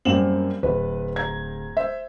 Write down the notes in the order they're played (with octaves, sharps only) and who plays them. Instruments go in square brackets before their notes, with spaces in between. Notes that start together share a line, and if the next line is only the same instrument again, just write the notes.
[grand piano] F#2 E7 F#7 [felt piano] G3 A#3 C4
[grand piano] D1 [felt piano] B4
[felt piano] A#5 G#6
[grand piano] C5 E5